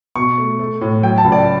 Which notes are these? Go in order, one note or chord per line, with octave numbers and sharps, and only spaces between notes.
B2 C#6
A3
A3
A2
F#3 G5
A5
C#2
D5